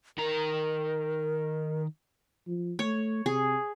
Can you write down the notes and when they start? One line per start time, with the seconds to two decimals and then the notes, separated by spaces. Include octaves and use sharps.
0.18 D#3 A#4 A#5
2.48 F3
2.79 A3 C#5
3.26 C3 G#4